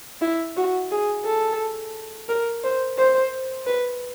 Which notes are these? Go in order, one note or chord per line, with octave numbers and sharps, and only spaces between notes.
E4
F#4
G#4
A4
A#4
C5
C5
B4